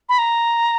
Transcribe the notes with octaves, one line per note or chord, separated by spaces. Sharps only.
B5
A#5